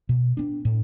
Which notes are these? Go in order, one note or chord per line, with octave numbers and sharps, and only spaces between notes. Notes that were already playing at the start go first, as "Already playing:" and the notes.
B2
B3 D4
A2